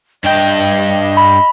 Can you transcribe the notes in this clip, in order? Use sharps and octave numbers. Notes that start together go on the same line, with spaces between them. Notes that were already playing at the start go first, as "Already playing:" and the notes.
G2 D#5 G5
B5